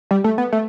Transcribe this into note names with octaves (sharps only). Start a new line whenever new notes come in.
G3
A3
B3
A3